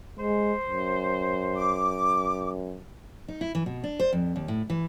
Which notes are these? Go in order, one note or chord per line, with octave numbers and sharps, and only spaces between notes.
G#3 C5
F#2
D6
D#4
E4
E3
B2
D4
C5
F2
D#2
A2
E3